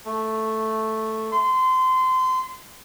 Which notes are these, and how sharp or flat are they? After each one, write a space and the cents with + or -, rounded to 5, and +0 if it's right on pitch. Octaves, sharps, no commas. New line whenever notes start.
A3 +0
C6 -25